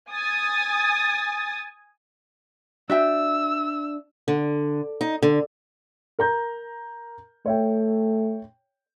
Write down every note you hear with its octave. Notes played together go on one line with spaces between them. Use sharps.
G#5 D#6 A6
D4 F#4 E5 G5 E6
D3
D#4
D3
A#4 A#5 G6
A3 C#5 E5 G5